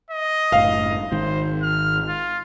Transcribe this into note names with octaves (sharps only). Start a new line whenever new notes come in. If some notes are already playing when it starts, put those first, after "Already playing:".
D#5
F#1 A2 F5
G#1 G#2 D#3 C5
F6
F4